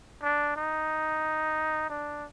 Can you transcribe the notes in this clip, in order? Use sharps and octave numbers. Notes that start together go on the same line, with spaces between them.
D4
D#4
D4